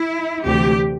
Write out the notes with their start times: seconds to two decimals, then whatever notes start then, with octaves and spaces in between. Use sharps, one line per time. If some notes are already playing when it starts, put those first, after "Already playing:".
Already playing: E4
0.44 D2 C3 E3 A3 G4